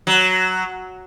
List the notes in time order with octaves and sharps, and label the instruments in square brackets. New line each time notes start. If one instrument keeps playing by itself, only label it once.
[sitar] F#3